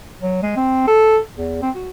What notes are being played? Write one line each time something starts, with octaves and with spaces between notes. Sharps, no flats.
F#3
G#3
C4
A4
E2
C4
F#4